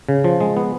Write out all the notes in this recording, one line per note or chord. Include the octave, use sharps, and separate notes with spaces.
C#3
F3
G#3
B3